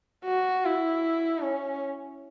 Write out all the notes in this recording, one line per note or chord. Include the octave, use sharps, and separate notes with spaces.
F#4
E4
C#4